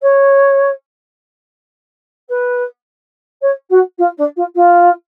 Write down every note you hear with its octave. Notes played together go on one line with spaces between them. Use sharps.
C#5
B4
C#5
F#4
F4
D4
F4
F4